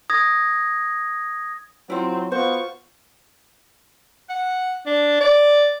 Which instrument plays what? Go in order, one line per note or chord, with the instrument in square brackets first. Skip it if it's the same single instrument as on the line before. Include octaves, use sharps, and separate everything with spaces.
[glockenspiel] D#6 G#6 A#6
[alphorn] F#3 [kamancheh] C4 [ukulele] E4 F4
[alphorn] B3 [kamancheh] F4 C#6 [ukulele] F#4 C5
[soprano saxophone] F#5
D4
D5